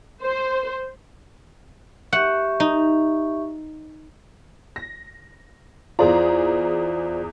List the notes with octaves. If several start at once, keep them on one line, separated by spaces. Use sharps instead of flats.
C5
G4 E5 F#5 C#6
D#4
A#6
E2 F4 G#4 C5 D5 A#5